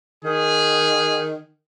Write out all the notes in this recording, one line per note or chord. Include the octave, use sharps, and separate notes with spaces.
D#3 G#4